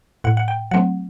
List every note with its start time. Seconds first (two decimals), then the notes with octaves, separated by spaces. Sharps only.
0.24 A2 F#5
0.37 F#5
0.48 G5
0.71 F#3 A3 C4 F#5